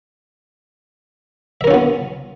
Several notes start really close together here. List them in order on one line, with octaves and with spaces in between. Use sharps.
E5 A#4 C#4 F4 B3